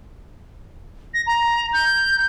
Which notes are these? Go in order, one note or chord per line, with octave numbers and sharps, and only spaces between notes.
A#6
A#5
G6